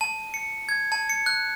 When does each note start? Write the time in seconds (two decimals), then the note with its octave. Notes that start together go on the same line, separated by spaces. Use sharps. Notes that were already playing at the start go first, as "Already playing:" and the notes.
0.01 A5
0.34 C#7
0.69 G#6
0.92 A5
1.10 C#7
1.26 F#6